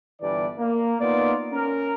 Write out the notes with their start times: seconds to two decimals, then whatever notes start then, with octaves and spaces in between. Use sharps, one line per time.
0.22 G1 E3 G3 D4 D5
0.59 A#3
1.01 A#3 B3 D#4 F4 D5
1.53 C#4 A#4